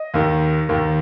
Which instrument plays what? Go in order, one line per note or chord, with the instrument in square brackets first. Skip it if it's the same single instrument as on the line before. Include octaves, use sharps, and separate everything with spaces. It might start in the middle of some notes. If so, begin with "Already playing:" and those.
Already playing: [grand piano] D#5
D#2 D#3
D#2 D#3